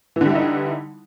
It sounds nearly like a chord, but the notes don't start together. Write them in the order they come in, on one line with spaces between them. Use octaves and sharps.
E3 D3 G3 E4 D#4